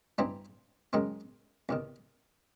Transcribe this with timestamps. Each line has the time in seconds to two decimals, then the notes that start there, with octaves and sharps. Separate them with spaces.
0.18 G2 E3 G3 C4 D#4
0.93 F#2 D#3 G#3 C4 D#4
1.69 E2 C3 D#3